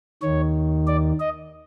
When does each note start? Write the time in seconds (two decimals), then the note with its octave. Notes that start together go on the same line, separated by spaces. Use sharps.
0.22 D#2 D#3 C#5
0.87 D5
1.20 D#5